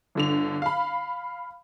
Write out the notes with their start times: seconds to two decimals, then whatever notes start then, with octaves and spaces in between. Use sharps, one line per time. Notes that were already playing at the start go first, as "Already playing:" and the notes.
0.15 G1 D3 F7
0.62 F5 B5